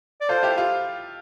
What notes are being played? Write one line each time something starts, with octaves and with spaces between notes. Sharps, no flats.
D5
F4 A4 C5
E4 G4
F4